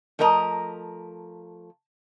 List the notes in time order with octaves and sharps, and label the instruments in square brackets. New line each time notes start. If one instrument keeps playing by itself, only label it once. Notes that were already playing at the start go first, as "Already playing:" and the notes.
[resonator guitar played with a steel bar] F3 A3 A#4 D#5 A#5